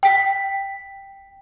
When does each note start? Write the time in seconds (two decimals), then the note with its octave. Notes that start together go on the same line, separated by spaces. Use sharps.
0.03 G5 B6